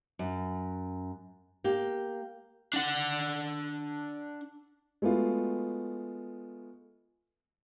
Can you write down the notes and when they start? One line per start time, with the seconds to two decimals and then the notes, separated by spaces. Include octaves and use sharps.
0.19 F#2
1.64 A#3 G4
2.73 D4 F#5
5.02 G#3 A3 B3 F4 F#4